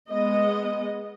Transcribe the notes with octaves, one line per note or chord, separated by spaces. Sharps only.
G#3 B3 D#5